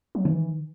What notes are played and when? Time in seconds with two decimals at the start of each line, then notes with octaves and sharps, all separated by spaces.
0.15 F#3
0.25 D#3 E3